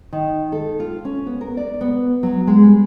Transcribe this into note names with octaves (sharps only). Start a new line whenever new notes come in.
D#3
A4
F4
C#4
B3
A#4
D5
B3
F#3
G#3
G3